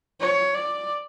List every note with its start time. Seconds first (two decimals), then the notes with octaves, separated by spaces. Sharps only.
0.21 C#5
0.54 D5